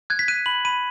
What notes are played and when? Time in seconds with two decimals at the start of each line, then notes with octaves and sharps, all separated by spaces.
0.10 F#6 G#6
0.19 B6
0.28 F#6 D#7
0.46 B5 F#7
0.65 B5 D#7